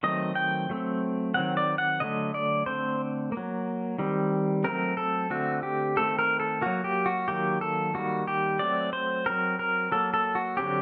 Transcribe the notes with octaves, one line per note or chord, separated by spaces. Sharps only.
D#3 F#3 A3 C4 D#5
G5
F#3 A3 C4
D#3 F#3 C4 F#5
D5
F#5
D3 F#3 A3 D#5
D5
D3 A3 C4 C5
A#3
F#3
D#3 G3 C4
F#3 A3 C4 A#4
A4
D3 A3 C4 F#4
G4
D#3 A3 C4 A4
A#4
A4
F#3 A#3 F#4
G4
F#4
D#3 F#3 A#3 G4
A4
D#3 G3 A#3 F#4
G4
F#3 A3 C4 D5
C5
F#3 C4 A#4
A#4
F#3 A#3 A4
A4
F#4
D3 F#3 C4 G4